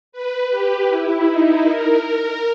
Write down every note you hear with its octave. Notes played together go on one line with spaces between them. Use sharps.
B4
G4
E4
D#4
A#4
A#4